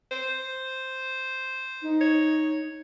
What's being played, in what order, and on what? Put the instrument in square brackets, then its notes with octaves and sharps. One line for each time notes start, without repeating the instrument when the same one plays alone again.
[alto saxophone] C5
[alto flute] D#4
[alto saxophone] C#5